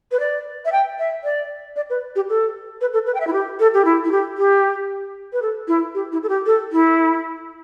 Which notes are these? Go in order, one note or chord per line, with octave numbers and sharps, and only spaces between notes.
B4
D5
E5
G5
E5
D5
D5
B4
G4
A4
B4
A4
B4
G5
E5
E4
G4
A4
G4
E4
E4
G4
G4
B4
A4
E4
G4
E4
A4
G4
A4
E4